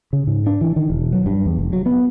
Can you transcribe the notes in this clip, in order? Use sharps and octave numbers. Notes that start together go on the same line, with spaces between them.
C#3
G#2
D4
E3
D#3
E1
F#3
G2
E2
F1
F#3
B3